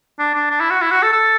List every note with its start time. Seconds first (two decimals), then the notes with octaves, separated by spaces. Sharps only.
0.19 D4
0.35 D4
0.51 D4
0.61 E4
0.71 F#4
0.82 E4
0.92 F#4
1.03 A4
1.13 A4